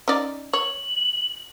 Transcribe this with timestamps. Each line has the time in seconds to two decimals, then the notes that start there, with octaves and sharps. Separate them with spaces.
0.08 C#4 D#4 D5
0.53 C#5 F#7